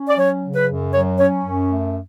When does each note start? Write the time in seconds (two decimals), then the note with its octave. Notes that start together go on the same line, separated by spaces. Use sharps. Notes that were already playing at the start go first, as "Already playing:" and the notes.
Already playing: C#4
0.09 D5
0.17 F#3 C#5
0.43 C#3
0.56 B4
0.68 F#2
0.93 F#3 C#5
1.18 C#4 C#5
1.44 F#2
1.69 A3